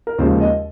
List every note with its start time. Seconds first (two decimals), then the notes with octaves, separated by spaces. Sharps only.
0.07 A#4
0.19 D#2 C#3 F3 G#3 C5
0.40 D#5